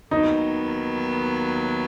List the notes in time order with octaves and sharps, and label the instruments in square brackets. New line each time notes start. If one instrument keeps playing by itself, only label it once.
[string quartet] D#2 D#3 F#3 B3 [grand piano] D#4